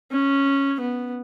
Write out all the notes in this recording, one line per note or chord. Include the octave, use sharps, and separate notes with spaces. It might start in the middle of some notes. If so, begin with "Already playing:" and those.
C#4
B3